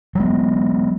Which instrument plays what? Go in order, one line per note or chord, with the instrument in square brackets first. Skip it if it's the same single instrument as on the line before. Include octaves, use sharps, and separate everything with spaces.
[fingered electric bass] F#3 G#3 B3